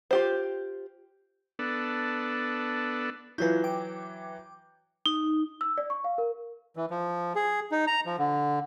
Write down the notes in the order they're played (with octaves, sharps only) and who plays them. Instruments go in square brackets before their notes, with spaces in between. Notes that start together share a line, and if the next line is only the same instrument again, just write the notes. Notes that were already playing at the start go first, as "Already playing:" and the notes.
[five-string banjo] F4 G4 C5
[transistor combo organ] B3 D4 A4
[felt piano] E3 F#3 G6 [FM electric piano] E4 F4
[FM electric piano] G5 D6
[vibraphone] D#4
[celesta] E6
D5
C#6
F5
A#4
[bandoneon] E3
F3
G#4
D#4
A#5
F3
D3